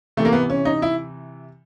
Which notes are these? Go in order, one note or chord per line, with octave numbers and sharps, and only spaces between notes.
C3 E3 A3
A#3
B3
C#4
D#4
E4